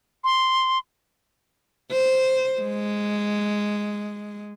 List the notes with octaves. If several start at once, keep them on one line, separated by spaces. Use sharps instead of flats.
C6
C5
G#3